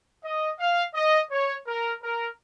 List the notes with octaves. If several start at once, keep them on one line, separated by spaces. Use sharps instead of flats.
D#5
F5
D#5
C#5
A#4
A#4